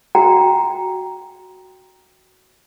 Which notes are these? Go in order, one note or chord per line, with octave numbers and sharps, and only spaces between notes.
F#4 G5 A#5